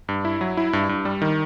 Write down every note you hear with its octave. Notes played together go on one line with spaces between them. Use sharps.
G2
E4
F#3
E4
G2
G2
G3
D#3